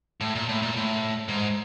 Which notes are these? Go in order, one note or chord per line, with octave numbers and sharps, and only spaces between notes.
A2
A#2
A2
A#2
A2
G#2